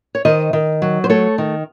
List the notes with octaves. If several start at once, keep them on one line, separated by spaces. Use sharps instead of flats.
C#5
D#3 C5 D#5
D#3
F#3
C5
A3 A4 C#5
D#3